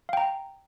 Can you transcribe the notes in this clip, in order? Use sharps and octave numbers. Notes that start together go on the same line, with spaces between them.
F5 G5 A#5